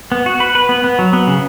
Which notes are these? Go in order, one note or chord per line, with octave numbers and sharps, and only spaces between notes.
B3
F#4
B4
B4
B3
B3
F#3
B3
C#3